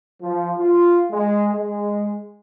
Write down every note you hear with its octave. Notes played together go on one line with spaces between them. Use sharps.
F3
F4
G#3
G#3